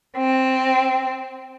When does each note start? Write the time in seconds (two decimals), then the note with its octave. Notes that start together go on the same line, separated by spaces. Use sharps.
0.16 C4